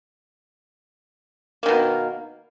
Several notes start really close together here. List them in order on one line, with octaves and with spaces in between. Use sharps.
A#3 D#3 B2